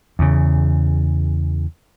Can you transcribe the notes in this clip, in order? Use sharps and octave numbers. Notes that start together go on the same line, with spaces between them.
E2 C#3